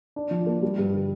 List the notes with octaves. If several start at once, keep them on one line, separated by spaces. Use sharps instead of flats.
D4
F3
A#3
G3
G2
D3